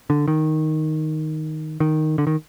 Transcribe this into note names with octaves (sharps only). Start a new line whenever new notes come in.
D3
D#3
D#3
D3
D#3